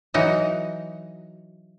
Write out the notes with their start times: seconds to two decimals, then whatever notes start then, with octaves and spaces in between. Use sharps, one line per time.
0.14 E3 F#3 D#4 F#4